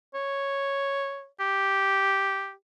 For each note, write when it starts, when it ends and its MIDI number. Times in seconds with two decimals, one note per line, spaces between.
0.14 1.26 73
1.40 2.51 67